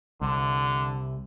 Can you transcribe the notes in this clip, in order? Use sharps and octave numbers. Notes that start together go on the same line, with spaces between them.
C2 D3